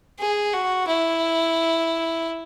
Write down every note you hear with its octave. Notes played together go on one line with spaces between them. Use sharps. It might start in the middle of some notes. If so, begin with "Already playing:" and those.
G#4
F#4
E4